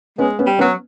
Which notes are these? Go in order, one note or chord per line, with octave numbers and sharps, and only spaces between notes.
G#3 B3 C#4
B3 C#4
G3
F#3 B3 C#4